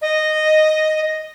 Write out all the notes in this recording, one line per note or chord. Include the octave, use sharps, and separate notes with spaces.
D#5